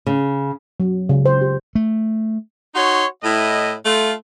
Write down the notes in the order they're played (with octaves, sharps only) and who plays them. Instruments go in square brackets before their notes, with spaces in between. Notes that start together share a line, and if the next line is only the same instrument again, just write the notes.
[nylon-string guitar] C#3
[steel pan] F#3
C#3
C5
G4
[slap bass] A3
[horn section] D#4 F#4 C#5 C6
A2 E4 D#5
A3 F4